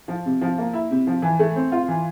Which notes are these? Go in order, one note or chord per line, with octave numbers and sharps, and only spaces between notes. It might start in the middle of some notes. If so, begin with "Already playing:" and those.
F3
C3
F3
A#3
E4
C3
F3
E3
A3
C4
F4
E3